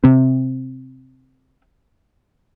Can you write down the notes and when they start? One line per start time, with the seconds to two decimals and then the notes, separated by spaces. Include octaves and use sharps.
0.04 C3 C4